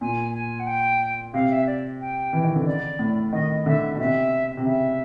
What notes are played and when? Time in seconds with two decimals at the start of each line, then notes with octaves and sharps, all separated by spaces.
0.01 A#2 G#5
0.34 G#5
0.60 F#5
0.67 G5
1.34 C3 F5
1.50 E5
1.67 D5
2.01 G5
2.33 E3
2.44 D#3
2.56 D3
2.66 C#3 D5
2.99 A2
3.33 D#3 D#5
3.66 D3 E5
3.95 B2
3.99 C3 E5
4.57 C3
4.65 C#3 E5